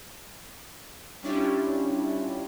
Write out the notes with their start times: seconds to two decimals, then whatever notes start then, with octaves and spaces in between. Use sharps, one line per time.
1.22 G3 C#4 D4 E4 F4 G4